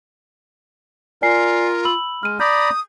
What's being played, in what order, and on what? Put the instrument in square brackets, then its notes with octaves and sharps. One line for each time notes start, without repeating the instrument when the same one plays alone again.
[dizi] F4 [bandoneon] A#4 [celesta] D5 G#5 C7
[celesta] B5 E6 F#7
[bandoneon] G#3 [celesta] F6 D#7
[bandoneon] D5 A#5 B5 [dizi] D#6 [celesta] G6